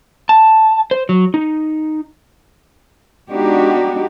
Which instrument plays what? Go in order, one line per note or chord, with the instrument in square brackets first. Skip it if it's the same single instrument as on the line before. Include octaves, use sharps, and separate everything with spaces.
[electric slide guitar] A5
C5
F#3
D#4
[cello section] G#3 B3 D4 D#4 F#4 G4